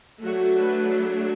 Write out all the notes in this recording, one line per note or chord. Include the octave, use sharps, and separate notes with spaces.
F#3 A3 D4 F#4
B4